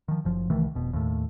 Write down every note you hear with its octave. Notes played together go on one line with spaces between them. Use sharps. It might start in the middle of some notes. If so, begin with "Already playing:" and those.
D#3 F3
F#1 F3
C2 D#3 E3 A3
F1 B2
D#2 A2